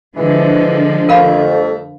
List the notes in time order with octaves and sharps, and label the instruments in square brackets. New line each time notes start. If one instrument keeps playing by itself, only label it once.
[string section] D3 F3 [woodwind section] E3 [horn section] G#3
[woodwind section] F2 [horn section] F#3 G3 A3 [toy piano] A#4 F5 B5